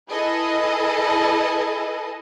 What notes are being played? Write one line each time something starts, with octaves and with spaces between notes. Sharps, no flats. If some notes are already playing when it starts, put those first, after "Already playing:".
E4 G#4 A4 B4 D#5